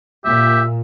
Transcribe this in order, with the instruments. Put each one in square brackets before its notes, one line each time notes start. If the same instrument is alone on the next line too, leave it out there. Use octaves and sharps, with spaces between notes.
[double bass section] A#2 [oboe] G4 [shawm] E5